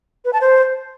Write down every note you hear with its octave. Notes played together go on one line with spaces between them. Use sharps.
B4
A5
C5